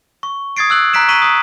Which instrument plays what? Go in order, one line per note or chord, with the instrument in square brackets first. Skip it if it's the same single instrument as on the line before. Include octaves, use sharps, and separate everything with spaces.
[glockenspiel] C#6
D#6 G#6 A6 C7 D7
E6 F#6 F#7
A#5 F#6 B6 D7 E7
A#5 C#6 B6 D7 D#7 F#7
D#6